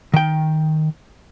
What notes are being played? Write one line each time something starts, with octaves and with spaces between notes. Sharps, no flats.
D#3 G5